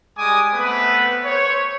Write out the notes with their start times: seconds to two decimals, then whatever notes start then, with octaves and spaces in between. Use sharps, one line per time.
0.18 G3 G#3 G#5 D6 D#6
0.55 A3 B3 C4 B4
1.25 C5 C#5